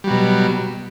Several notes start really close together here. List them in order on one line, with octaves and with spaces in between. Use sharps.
G3 F#3 B2